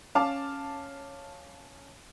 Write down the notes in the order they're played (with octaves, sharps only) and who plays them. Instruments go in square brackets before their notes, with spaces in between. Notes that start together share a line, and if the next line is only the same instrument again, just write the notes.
[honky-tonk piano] C#4 F5 A5 D6 F6